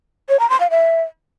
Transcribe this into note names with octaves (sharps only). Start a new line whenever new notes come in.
C#5
A#5
C6
F5
E5